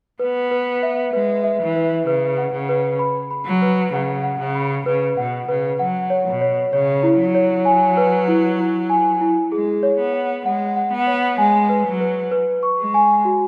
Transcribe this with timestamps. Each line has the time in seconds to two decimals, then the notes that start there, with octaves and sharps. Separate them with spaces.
0.19 B3 B4
0.51 B4
0.83 E5
1.13 G#3 B4
1.44 E5
1.60 E3
1.76 B4
2.06 C#3 B4
2.38 F#5
2.53 C#3
2.69 B4
2.99 B5
3.31 B5
3.46 F#3
3.62 B4
3.92 C#3 F#5
4.23 F#5
4.39 C#3
4.55 B5
4.86 C#3 B4
5.17 B2 F#5
5.48 C#3 B4
5.79 F#3 F#5
6.10 C#5
6.26 B2
6.41 C#5
6.72 C#3 C#5
7.03 E4
7.19 F#3
7.35 C#5
7.65 G#5
7.97 B4
8.28 E4
8.59 E4
8.90 G#5
9.21 E4
9.52 G#3 G#4
9.83 C#5
9.98 B3
10.14 F#5
10.45 G#3 F#5
10.76 F#5
10.92 B3
11.07 C#5
11.38 G#3 G#5
11.69 B4
11.86 F#3
12.00 B4
12.31 B4
12.63 C#6
12.78 G#3
12.94 G#5
13.25 F#4